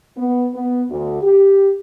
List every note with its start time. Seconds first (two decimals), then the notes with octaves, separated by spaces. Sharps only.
0.17 B3
0.54 B3
0.90 D2
1.22 G4